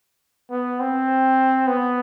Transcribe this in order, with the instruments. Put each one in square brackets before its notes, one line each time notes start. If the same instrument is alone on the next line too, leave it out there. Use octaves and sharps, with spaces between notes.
[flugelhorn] B3
C4
B3